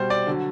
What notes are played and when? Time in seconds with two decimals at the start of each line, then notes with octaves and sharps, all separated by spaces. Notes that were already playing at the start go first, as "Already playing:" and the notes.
Already playing: B2 G3 C5
0.10 D5
0.27 D3 F#3